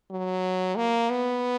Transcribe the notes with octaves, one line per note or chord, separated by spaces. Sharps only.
F#3
A#3
B3